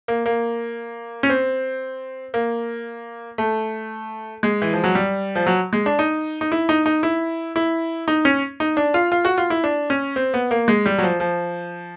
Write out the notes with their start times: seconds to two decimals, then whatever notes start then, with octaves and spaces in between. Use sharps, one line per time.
0.08 A#3
0.26 A#3
1.23 C#4
1.30 C4
2.34 A#3
3.38 A3
4.43 G#3
4.62 E3
4.73 F3
4.84 F#3
4.95 G3
5.35 F3
5.47 F#3
5.73 G#3
5.86 D4
5.99 D#4
6.41 D#4
6.52 E4
6.69 D#4
6.86 D#4
7.03 E4
7.56 E4
8.08 D#4
8.25 C#4
8.60 D#4
8.77 D4
8.94 F4
9.12 F4
9.25 F#4
9.38 F4
9.50 E4
9.64 D4
9.90 C#4
10.16 C4
10.34 B3
10.51 A#3
10.68 G#3
10.86 G3
10.98 F#3
11.03 F3
11.20 F3